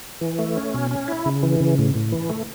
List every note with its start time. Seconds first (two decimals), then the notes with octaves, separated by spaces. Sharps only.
0.21 E3
0.39 A3
0.56 C#4
0.74 B2
0.91 C#4
1.08 E4
1.26 C#3
1.43 E3
1.60 C#3
1.78 A2
1.95 A2
2.12 E3
2.30 A3